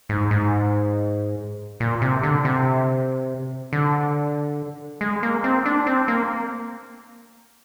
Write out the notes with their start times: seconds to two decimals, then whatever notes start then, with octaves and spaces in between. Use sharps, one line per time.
0.09 G#2
0.31 G#2
1.80 A#2
2.02 C3
2.23 D3
2.45 C3
3.73 D3
5.01 G#3
5.23 A#3
5.44 C4
5.65 D4
5.87 C4
6.08 A#3